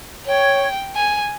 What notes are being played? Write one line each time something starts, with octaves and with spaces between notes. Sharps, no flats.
C#5 G5
G#5